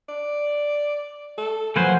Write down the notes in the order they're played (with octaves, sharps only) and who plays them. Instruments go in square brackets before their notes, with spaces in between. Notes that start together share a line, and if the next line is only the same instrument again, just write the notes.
[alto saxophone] D5
A4
[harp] F3 F#3 [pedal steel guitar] A#3 B4 C5 [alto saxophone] G#5